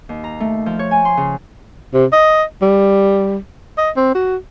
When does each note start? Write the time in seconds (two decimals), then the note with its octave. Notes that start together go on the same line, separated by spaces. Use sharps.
0.09 D#2
0.24 A#5
0.40 A3
0.66 F3
0.79 C#5
0.91 G#5
1.05 C6
1.17 C#3
1.94 C3
2.13 D#5
2.62 G3
3.78 D#5
3.96 C4
4.15 F#4